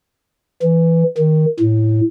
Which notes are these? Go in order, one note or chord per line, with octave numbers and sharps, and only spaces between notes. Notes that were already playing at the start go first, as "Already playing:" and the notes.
E3
D#3
A2